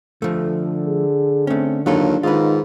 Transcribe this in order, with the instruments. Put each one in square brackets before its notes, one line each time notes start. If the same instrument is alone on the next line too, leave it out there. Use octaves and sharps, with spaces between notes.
[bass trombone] D3 [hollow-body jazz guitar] F3 A3
[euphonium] G#4
[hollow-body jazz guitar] A3 C#4 [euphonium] C4
[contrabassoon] D#2 [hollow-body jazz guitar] F#3 F4 A4 [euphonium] D4
[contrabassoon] G#2 [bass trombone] D#3 [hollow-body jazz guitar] F4 B4